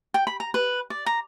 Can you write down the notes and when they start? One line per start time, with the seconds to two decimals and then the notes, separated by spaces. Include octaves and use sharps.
0.14 G5
0.27 B5
0.40 A#5
0.54 B4
0.90 D5
1.06 A#5